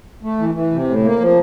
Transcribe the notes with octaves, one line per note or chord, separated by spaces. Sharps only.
A3
E3
E3
C3
A2
A#3
F3